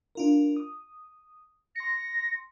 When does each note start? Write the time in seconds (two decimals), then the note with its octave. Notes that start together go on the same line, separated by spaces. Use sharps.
0.15 D4 F4 A#4
0.56 D#6
1.76 C6 A#6 C#7